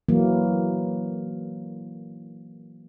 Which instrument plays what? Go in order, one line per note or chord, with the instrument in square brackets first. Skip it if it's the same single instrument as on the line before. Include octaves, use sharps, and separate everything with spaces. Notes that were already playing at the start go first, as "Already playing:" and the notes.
[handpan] E3 F#3 A#3